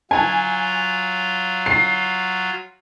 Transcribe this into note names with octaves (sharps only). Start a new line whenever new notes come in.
F#3 F4 G#5
C7